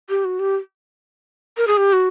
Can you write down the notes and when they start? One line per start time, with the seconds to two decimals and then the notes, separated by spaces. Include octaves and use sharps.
0.09 G4
0.25 F#4
0.39 G4
1.57 A#4
1.67 G#4
1.77 G4
1.93 F#4